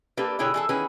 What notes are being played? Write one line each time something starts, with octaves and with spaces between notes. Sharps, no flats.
A#3 D4 G4 A4 B4
B2 D3 E4 G#4 C#5 G5
E3 G#4 A4
D#3 E3 B3 C#4 G#4 B4